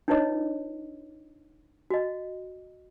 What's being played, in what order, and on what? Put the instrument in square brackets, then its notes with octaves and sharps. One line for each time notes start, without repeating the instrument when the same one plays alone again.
[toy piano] D4 D#4 F4 B4 C#5 D#5
F#4 D#5